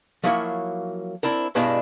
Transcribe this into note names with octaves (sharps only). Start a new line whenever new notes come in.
F3 F#3 A#3 E4 C#5
C4 D4 E4 A#4
G2 B2 G3 G#3 D4 E4